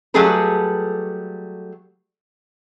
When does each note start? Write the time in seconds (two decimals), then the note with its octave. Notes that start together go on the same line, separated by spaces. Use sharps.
0.14 F#3 G3 A3 G#4 A4 B4